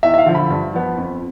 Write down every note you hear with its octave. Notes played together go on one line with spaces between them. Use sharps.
E2 E5
E5
F5
D3 F3
B5
G2
F3 B3
F2